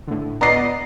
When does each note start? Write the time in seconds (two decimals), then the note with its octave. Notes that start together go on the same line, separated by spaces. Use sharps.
0.07 A2 D3
0.41 B3 D5 D#5 A#5 C7